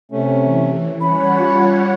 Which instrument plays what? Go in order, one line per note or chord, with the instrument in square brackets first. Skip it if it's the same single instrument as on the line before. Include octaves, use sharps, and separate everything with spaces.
[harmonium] C3 A3 C#4
[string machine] E3
[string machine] G3 C#5 F#5 [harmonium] C#4 [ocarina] B5
[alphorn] F4